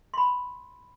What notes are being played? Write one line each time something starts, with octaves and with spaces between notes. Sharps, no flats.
B5 C6